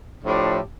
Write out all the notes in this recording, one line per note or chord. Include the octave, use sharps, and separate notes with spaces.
A2 F3 A3 D4 G4